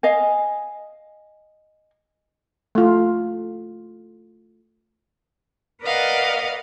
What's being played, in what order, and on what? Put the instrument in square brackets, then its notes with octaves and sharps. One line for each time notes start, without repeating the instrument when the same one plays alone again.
[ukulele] D#5 F5 G#5
[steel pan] A3 F4
[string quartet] A#4 B4 D5 D#5 F5 F#5